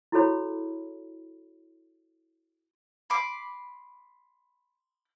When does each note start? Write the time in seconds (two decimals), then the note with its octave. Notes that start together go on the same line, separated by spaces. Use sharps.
0.12 E4 F#4 G#4 A4 C#5 B5
3.10 B5 C6 D6